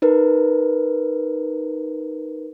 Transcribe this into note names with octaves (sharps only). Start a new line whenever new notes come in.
D#4 A#4 B4